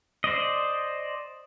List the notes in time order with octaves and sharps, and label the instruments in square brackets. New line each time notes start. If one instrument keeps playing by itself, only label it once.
[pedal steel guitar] C5 D5 D#5